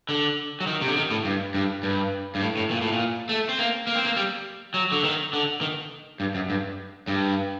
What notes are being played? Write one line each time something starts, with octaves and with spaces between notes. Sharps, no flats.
D3
F#3
D#3
C3
D3
D#3
A2
G2
G2
G2
G2
A2
A2
A#2
A2
A#2
A3
C4
A#3
A#3
C4
A#3
G3
F#3
D3
D#3
D3
D#3
G2
F#2
G2
G2